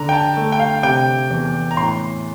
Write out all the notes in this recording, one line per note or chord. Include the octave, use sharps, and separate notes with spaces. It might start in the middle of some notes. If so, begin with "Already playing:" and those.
Already playing: D3 A#5
G5
A5
A3
G5
F5
C3 G5
E2
A#5
A2 C6